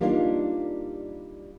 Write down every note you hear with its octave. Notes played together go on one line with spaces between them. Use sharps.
G3 A#3 D4 D#4 F4